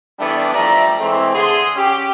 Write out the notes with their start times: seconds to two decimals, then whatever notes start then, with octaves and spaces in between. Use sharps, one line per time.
0.19 E3 G3 A3 B3 D4
0.54 F3 G3 A3 D5 E5 A#5
1.00 E3 G#3 A3 C4
1.34 D3 G#4 C6
1.76 C#4 G4